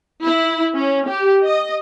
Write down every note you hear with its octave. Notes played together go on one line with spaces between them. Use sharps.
E4
C#4
G4
D#5